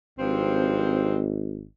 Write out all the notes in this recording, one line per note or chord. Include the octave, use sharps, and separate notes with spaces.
G#1 G2 F3 C4